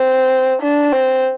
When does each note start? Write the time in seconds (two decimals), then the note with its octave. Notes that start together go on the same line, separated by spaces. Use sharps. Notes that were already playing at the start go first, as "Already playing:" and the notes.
Already playing: C4
0.62 D4
0.92 C4